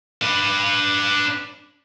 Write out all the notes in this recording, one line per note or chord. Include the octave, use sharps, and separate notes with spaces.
D4 B4